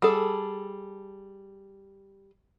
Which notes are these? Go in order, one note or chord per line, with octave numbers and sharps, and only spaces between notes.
G3 G#4 A4